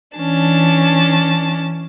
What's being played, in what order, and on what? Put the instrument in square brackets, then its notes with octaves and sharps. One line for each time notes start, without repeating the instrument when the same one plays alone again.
[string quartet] E3 C#4 D4 A5